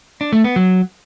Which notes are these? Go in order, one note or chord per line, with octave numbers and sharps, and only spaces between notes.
D4
A3
B3
F#3